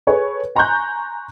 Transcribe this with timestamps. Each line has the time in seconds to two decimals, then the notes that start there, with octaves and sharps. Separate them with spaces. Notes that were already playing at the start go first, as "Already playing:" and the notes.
0.07 G#4 A4 B4 C#5
0.56 G#5 A#5 C6 C#6 F#6 G6